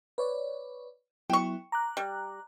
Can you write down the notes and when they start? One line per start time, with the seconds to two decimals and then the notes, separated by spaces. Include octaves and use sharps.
0.18 B4 C#5 D5
1.30 F#3 B3 E4 G5 C#6
1.72 A#5 D6 F#6
1.97 G3